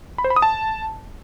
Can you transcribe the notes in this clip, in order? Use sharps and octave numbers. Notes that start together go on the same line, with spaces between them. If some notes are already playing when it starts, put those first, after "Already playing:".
B5
C5
B5
D#6
A5